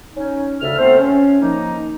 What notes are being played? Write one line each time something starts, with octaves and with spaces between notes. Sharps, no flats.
C#4 D#4
D2 C#3 A4 E5 F6
A3 B3 C4 A4 C5
C#4
D#3 F3 A#3 D#4